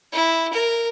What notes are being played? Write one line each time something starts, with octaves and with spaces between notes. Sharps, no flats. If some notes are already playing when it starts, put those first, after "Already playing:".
E4
A#4